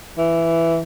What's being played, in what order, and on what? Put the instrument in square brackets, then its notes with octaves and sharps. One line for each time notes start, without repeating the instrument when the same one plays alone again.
[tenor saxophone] E3